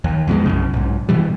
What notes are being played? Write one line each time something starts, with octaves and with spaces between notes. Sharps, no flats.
D#2
F2 B2 F3 G#3
B1 F#2 C#3
B1 G#2
B2 E3 G3